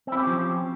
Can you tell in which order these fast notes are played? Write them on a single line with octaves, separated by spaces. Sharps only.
C4 E4 G4 C#4 F3